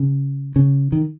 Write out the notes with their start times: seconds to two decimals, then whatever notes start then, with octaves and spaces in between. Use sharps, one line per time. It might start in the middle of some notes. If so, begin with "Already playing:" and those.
Already playing: C#3
0.56 C#3
0.92 D#3